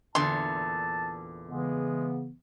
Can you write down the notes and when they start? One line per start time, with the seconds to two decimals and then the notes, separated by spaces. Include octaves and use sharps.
0.15 E2 A#2 D3 A5 C6
1.48 C#3 E3 G#3 B3